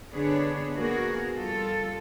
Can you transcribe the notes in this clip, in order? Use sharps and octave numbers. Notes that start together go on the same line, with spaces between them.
D3 B3 D4 G#4 B4 C#5
A#3 B3 F#4 G#4 A#4
G3 F4 A4